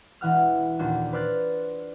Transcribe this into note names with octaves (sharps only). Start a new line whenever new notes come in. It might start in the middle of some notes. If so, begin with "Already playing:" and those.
E1 E3 F#5 F6
D#2 A#2 D4 F4 F#4
B4 C5 D5 F6 F#6 A6